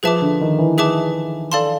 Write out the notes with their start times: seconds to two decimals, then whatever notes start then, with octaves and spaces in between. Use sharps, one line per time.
0.03 F3 G#4 B4 E5 A5 D6
0.21 D3
0.41 D#3
0.59 E3
0.78 G#4 B4 E5 A5 D6
1.52 A4 D5 F5 A5 C6